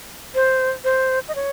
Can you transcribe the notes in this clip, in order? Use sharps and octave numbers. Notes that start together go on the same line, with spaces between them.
C5
C5
D#5
C#5